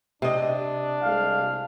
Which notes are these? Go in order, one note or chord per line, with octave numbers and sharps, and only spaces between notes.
C3 D4 D#5
C2 G#3 F5